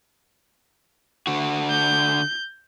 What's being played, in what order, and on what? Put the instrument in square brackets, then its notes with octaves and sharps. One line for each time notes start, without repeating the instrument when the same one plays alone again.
[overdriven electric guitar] D3 F#4
[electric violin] G6